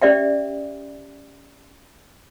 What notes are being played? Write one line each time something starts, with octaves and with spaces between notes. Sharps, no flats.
C#4 G4 D5 E5 G5